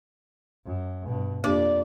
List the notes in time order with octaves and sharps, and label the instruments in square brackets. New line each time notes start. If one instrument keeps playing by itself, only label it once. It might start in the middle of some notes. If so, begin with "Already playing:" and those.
[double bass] F#2
G2 B2
[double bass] F2 [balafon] A#3 D4 G4 [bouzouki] D5